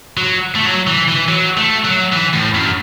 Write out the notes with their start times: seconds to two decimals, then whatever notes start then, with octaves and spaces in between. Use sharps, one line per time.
0.17 F#3
0.56 A3
0.66 F#3
0.87 E3
1.09 E3
1.28 F#3
1.57 A3
1.84 F#3
2.12 E3
2.33 A2
2.55 F#2